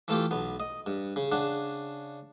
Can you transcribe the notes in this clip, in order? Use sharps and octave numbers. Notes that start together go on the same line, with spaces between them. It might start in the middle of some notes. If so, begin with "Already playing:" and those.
E3 A3 F4 G4
B1 B3
D#5
G2
C#3
C#3 D4 F#5